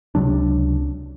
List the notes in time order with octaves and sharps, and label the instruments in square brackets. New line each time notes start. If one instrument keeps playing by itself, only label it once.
[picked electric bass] C#2 C3 F#3 D4